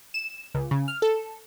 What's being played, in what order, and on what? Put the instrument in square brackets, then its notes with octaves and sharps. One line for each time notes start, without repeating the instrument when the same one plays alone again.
[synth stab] E7
C#2
C#3
F6
A4